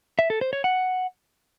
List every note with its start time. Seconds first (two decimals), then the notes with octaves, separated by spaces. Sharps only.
0.19 E5
0.30 A4
0.41 C5
0.53 C#5
0.64 F#5